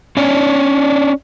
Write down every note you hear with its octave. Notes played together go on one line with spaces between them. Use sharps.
C#4 D4 C#5 D5